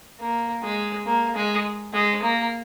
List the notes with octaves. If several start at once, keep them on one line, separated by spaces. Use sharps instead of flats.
A#3
G#3
A#3
G#3
G#3
A#3